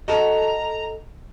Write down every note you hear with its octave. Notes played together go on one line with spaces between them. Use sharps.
F#4 A4 D#5 A#5